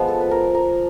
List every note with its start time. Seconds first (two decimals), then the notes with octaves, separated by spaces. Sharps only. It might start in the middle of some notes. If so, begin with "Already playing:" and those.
Already playing: F3 G#3 B3
0.08 A4
0.21 B4
0.31 A#4
0.54 A#4